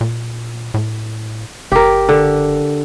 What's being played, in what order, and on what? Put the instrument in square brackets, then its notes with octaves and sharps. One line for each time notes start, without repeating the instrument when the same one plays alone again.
[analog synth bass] A#2
A2
[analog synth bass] F#1 [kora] G4 A#4
[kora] D3